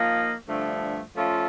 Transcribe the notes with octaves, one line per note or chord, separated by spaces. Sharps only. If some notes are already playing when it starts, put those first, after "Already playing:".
Already playing: F3 A#3 D#4
G2 D3 F3 A3
F3 A3 C#4 F4 A4